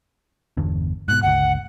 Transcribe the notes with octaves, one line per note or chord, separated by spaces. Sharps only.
G1 E2 D3
G#2 B2 F#6
G1 C#2 F#5